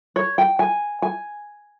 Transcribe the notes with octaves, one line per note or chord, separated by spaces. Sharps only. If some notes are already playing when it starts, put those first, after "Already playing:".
C#5
G5
G#5
G#5